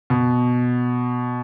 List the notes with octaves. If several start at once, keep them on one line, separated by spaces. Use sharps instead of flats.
B2